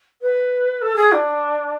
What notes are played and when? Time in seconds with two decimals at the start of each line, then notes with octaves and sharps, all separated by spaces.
0.21 B4
0.81 A4
0.96 G#4
1.12 D4